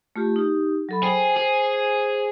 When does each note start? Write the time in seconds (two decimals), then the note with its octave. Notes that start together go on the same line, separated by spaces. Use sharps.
0.16 A3 F4 G4
0.36 D#4 G4
0.89 F#3 A4 B5
1.03 G#4 C5 G5 G#5
1.37 G#4 C5